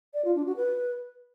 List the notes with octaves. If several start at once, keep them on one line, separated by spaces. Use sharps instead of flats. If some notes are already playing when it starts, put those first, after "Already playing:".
D5
F4
D4
F#4
B4